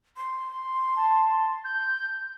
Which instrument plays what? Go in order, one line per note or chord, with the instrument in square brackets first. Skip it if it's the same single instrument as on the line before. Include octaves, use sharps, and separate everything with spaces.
[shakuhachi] C6
[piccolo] A5
G6